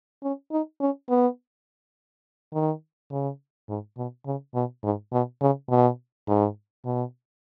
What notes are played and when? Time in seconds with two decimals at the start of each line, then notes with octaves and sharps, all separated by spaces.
0.23 C#4
0.51 D#4
0.80 C#4
1.09 B3
2.53 D#3
3.11 C#3
3.68 G#2
3.97 B2
4.26 C#3
4.54 B2
4.83 G#2
5.12 B2
5.41 C#3
5.69 B2
6.28 G#2
6.85 B2